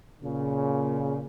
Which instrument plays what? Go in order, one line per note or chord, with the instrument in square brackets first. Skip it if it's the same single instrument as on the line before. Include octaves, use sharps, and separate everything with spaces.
[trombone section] A#2 C#3